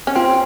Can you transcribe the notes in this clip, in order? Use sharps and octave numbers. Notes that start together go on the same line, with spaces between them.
C#4
C4 F4